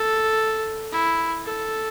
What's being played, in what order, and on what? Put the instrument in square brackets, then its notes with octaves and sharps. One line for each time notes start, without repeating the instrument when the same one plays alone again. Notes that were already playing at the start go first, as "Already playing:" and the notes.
Already playing: [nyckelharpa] A4
E4
A4